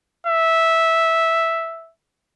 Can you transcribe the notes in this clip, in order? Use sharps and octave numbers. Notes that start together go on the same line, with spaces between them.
E5